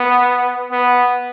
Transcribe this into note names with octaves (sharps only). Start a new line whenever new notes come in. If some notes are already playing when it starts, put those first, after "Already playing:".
Already playing: B3
B3